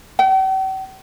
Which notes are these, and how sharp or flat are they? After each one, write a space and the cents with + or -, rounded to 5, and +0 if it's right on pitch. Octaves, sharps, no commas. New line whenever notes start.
G5 -45